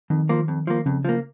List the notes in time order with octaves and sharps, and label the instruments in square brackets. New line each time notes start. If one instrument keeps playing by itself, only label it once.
[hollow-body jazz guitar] F2 [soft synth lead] D#3
[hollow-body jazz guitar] F3 A#3
F2
F3 A#3
[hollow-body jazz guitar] F2 [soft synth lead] C#3
[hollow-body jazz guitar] F3 A#3